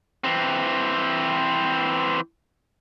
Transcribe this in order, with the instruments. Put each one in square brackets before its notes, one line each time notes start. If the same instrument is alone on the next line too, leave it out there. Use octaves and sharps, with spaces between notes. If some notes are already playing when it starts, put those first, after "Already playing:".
[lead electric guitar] E3 C4